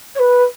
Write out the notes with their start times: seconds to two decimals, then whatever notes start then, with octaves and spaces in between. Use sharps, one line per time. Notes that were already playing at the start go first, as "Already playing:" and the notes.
0.15 C#5
0.19 B4